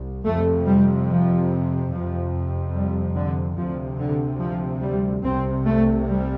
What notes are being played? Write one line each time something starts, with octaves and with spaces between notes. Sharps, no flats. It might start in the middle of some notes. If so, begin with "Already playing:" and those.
Already playing: C2
F2 C3 A3
G3
F3
F2 C3 F3
G3
D3
D2 C3 F3
D3
F3
G3
C2 C3 C4
A3
G3